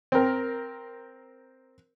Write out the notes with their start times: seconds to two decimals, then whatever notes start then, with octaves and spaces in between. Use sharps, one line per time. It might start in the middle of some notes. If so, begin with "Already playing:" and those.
0.12 C4 A#4